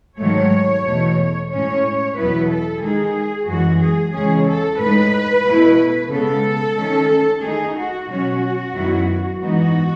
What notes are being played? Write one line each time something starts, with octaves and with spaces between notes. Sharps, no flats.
G#2 D#3 F#3 A3 C#5
E2 B2 A3
A2 G#3 C#4 C#5
E2 B2 F#3 B3 E4 B4
A4
D#3 G#3 D#4 G#4
F#2 E3 G#3 F#4
G#4
E2 C#3 G#3 C#4 G#4
A4
A2 G#3 D#4 B4
B2 A3 E4
C#3 G#3 B3 A4
D#3 A3 C#4
D#3 A3 D#4 G#4
F#4
B2 F#3 C#4 F#4
F#2 D#3 F#3 B3 E4
G#2 E3 B3 D#4 F#4